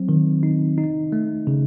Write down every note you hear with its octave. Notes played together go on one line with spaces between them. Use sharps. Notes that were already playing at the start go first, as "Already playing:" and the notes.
Already playing: F#3 C4
D#3
D#4
D#4
A3
C#3